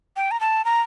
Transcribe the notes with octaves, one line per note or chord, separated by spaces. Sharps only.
G5
A#5
A5
A#5